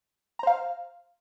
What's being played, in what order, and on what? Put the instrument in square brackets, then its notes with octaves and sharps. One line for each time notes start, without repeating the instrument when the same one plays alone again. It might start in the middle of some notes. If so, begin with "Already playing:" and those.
[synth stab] A#5
C5
F5